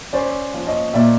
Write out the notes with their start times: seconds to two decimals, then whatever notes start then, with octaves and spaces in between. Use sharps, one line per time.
0.13 C#4 C5 D5
0.54 F3
0.67 C#5 D#5
0.94 A#2 D5 E5